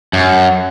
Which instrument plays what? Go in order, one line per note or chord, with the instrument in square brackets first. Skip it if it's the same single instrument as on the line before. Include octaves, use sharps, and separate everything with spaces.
[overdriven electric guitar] F#2